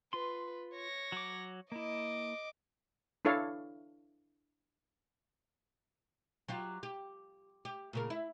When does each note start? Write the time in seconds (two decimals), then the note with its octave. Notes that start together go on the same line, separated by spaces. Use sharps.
0.13 F4 B4 C6
0.74 C#5 A#6
1.12 F#3 D6
1.72 A#3 E4 D#5 D6
3.25 D4 E4 A4 C#5 F5
6.48 F#3 F4 G4
6.83 G4
7.65 G4
7.93 A#2 C#3 A#4
8.10 E4